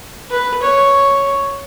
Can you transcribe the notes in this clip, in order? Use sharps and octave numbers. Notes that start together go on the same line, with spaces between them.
B4
C#5